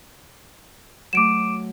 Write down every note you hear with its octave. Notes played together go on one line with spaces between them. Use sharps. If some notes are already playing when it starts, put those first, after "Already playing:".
F#3 A3 D6 D7 E7